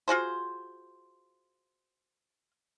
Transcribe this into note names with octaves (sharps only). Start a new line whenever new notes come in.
F4 F#4 G#4 C5